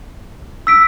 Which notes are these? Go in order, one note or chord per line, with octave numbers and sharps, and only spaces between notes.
E6 B6 D7